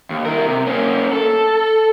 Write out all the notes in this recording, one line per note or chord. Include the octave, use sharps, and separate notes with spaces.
D#2
E4 A#4
C3
A#3 C#4
A4